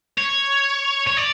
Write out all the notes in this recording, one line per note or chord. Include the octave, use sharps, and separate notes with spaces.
C#5
C#5
D5